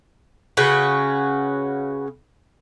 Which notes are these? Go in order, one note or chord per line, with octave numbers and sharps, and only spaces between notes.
C#3 C#4 F#4 B4